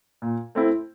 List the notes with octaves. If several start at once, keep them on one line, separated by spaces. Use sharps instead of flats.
A#2
A3 C4 E4